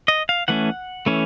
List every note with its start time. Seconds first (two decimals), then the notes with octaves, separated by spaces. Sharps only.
0.08 D#5
0.29 F5
0.48 E3 A3 C#4 F#5
1.06 E3 A3 C#4